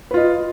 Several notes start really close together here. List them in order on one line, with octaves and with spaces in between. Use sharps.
B4 F4 D#5